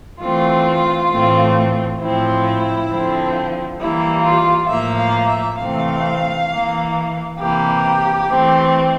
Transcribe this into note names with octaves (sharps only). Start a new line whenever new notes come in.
E3 A3 C4 F4
A2 E3 A3 C4
A2 F3 C4 E4
D3 F3 C4
E3 G3 A#3 E4
F4
A2 F3 A#3 E5
F5
E5
C3 E3 A3 C4 F5
E3 A#3
C3 E3 A#3 G4
E3 A3 C4